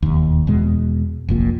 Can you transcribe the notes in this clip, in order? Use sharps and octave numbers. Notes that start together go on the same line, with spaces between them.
E1 D#2
E2 B2 G#3
F1 A#1 A#2